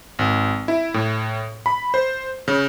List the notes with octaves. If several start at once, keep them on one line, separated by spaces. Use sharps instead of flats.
G#1
E4
A2
B5
C5
C#3